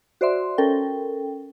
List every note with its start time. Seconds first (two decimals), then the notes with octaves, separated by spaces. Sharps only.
0.21 F#4 C5 D5 E5 C6
0.58 C#4 A4 A#4 G5